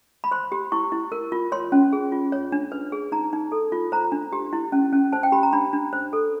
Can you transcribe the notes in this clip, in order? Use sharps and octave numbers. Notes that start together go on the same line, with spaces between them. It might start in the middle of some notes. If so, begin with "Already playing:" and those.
B5
C5 C6
G4
E4 C#6
E4
A#4
F4
C#5 C6
C#4
G#4
F4
C#5
D4
B4
G#4
D#4 A#5
D#4
A4
F4
C5 A#5
D4
G4
E4
C#4
C#4
C5 A5
G5
G4 B5
A#5
D4 B5
D4
C5
A4